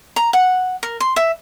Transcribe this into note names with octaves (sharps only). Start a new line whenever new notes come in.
A#5
F#5
A#4
C6
E5